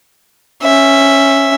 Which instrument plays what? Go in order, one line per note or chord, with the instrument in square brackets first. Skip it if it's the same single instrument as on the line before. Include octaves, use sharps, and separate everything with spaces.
[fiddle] C#4 E5